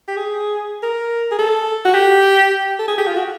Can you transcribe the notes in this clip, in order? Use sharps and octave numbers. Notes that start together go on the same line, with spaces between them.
G4
G#4
A#4
G#4
A4
F#4
G4
A4
G#4
G4
F4
F#4